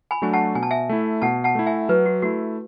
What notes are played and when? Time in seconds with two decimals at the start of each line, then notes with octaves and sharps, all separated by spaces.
0.11 G#5 B5
0.22 F#3 A3 D4 F#4 G#5
0.33 F#5 A5
0.55 B2 G#5
0.63 A5
0.71 E5 G#5
0.89 A3 E4
1.22 B2 F#5 A5
1.44 F#5 A5
1.55 A3 E4
1.66 E5 G#5
1.89 F#3 B4
2.06 F#4
2.22 A3 E4 F#4